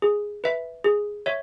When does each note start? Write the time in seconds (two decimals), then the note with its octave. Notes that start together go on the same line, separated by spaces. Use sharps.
0.02 G#4
0.44 B4 E5
0.84 G#4
1.26 C#5 E5